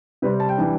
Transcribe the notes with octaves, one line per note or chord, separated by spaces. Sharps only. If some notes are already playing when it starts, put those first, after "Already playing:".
C3 G3 C4 B4
A5
G5
E3 G3 D4